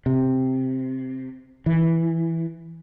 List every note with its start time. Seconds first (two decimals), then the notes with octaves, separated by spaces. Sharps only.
0.06 C3
1.66 E3